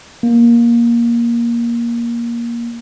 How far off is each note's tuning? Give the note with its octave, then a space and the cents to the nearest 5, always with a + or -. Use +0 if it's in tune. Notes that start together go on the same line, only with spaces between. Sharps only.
A#3 +15